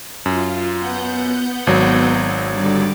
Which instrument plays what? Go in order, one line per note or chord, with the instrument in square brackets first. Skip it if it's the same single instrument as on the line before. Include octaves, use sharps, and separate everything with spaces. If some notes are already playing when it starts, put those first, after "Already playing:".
[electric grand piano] F#2 [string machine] F4
[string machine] B3 F#5 G6
[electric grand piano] G#1 F#3
[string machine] D3 G3 D5